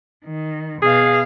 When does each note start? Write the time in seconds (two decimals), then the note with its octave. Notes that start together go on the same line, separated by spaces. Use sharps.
0.25 D#3
0.82 B2 G#4 F5